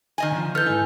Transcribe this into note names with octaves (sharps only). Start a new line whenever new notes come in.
D#3 D#5 G#5
D3 F3
E4 A4 B4 F6 G6
G#2 D#4 G#5